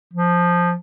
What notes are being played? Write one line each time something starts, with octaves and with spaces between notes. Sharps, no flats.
F3